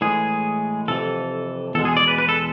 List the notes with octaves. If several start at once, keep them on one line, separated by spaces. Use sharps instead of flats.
A2 E3 G#3 G#4
F2 C3 E3 A4
E2 B2 G#3 A4
G#4
D5
B4
B4
A4